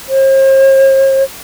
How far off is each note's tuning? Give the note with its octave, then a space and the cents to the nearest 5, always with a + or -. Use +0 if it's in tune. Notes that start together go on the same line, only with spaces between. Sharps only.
C5 +45